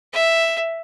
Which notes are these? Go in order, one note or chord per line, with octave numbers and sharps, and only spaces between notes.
E5